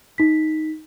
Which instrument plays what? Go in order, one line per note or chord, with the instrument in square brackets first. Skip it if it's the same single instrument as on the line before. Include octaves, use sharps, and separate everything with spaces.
[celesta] D#4 B6